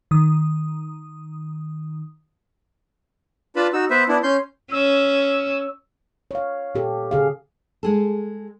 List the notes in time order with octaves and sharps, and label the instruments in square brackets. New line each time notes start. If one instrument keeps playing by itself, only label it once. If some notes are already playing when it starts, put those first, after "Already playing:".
[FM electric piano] D#3 D#6
[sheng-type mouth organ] D4 F4 B4 A5 B5
D#4 F#4 E6
B3 B4 C5 E5
B3 D4 E4
C#4 C6 G6
[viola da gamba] C#4 [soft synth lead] E6
[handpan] C#5 F5
A#2 G4 A4
C#3 G#4 F5
[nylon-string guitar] G#3 G#4 A4